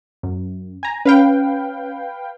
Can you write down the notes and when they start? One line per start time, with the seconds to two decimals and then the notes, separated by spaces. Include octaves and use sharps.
0.23 F#2
0.83 G#5 A#5
1.05 C#4 B4 F5 G5